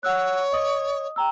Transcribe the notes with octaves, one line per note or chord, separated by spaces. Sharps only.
C#5 F#5 E6 F#6
D#5 D#6
G5 A#5 E6